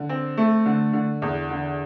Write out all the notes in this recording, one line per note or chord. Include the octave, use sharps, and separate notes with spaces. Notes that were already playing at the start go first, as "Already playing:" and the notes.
Already playing: D3
C4
A3
D3
D3
E2
D3